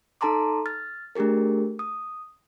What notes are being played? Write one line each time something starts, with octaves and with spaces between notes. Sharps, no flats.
D#4 A4 A5 A#5 C6 D6
F6 A6
A3 D4 G4 G#4 A#4
D#6